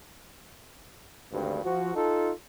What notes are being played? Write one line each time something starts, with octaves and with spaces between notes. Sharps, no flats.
G#1 D2 G2
F3 F#4
D#4 F4 A4